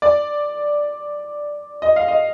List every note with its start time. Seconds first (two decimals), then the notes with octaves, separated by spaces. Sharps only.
0.02 D5
1.82 D#5
1.96 F5
2.08 D#5